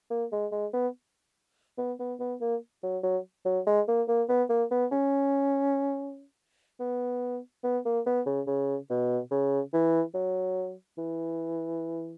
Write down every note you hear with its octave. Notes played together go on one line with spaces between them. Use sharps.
A#3
G#3
G#3
B3
B3
B3
B3
A#3
F#3
F#3
F#3
G#3
A#3
A#3
B3
A#3
B3
C#4
B3
B3
A#3
B3
C#3
C#3
B2
C#3
E3
F#3
E3